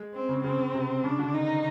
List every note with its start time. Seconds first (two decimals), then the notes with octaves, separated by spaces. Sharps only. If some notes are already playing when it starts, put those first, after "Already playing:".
Already playing: G#3
0.14 C4
0.29 C#3
0.44 C#3 C4
0.59 C#3
0.74 C3
1.04 C#3 D4
1.19 D3
1.34 D#3 D#4